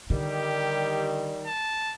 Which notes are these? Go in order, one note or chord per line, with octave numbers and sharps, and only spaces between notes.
D3 D#3 G3 G4
A5